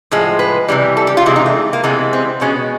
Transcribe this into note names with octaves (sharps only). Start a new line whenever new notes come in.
A2 F3 G#3
B4
C3 E3 G3
A4
G4
F4
C3 E3 G#3 E4
D#4
A3
A#3
C3 E3 G#3 B3
C4
B2 G#3 C#4